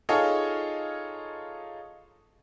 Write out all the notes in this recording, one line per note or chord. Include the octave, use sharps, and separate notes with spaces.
D#4 F4 G#4 A4 C#5 D#5